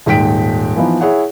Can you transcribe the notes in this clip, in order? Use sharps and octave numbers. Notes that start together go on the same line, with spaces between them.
D#1 G#2 G5 B6 D7
E3 F3 B3 D#4
E4 G#4 C#5 F#5